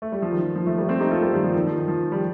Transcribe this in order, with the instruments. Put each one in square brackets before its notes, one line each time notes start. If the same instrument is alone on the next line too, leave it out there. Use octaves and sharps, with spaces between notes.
[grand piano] A3
G3
F3
D#3
F3
F3
F3 A3
G3 A#3
A3 C4
D#4 G4
F4 A4
G3 A#3
D#3 G3
F3
D#3
F3
D#3
F3
G3